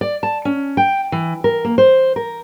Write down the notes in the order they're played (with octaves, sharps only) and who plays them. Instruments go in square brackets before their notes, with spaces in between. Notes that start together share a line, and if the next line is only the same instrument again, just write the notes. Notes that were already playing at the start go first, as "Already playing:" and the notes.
[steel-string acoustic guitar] D5
A5
C#4
G5
E3
A#4
A#3
C5
A#4